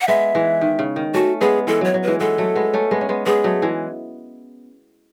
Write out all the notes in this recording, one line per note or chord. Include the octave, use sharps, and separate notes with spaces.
F#5
G#3 B3 E5
E3 G#3
D#3
C#3
D#3
A3 C#4 F#4
G#3 B3 G#4
E3 G#3 A4
F#3 C#5
F#3
E3 G#3 B4
G#3 B3 A4
F#3 A3
G#3 B3
A3 C#4
G#3 B3
C#4
G#3 B3
G#3 B3 G#4
F#3 A3
E3 G#3